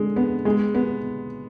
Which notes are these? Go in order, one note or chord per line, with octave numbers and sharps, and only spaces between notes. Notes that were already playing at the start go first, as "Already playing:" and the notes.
Already playing: D3 G#3
B3
G#3
B3